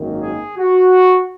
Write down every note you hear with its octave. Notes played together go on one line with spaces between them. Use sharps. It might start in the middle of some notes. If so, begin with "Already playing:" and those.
Already playing: G#1 F#2 D#3 A#3
G#4
F#4